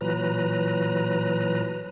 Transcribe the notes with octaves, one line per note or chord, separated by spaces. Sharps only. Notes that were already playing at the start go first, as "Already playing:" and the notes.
A#2 E3 F#3 B4 A#5